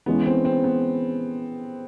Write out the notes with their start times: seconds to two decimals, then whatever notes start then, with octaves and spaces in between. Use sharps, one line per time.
0.06 E3 G#3 B3 C#4 E4
0.26 C4
0.45 C4
0.64 B3